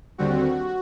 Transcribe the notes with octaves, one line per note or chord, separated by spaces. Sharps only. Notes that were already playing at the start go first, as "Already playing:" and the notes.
D#2 D3 G3 C4 F#4